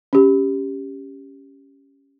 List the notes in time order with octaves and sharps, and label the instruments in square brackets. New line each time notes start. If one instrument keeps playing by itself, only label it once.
[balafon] C#4 G4